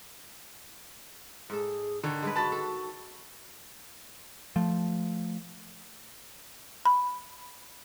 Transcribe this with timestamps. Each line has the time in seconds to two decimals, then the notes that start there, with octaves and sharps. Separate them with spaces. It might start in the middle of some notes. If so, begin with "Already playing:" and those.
1.50 G#2 G#4 A4
2.04 D3 D#3 C#5
2.22 G3 G#3 G#4 B4
2.35 F#4 A5 B5 A6
2.52 A4
4.56 F3 A3
6.85 B5